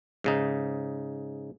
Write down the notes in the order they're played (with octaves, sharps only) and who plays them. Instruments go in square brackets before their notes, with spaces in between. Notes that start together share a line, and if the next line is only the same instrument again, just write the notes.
[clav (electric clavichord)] G#2 C#3 D#4